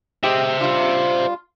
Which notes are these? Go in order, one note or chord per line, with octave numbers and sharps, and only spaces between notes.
G#3 G4 C5 E5
G3 D4 F4